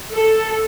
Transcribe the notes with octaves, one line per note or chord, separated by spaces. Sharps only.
A4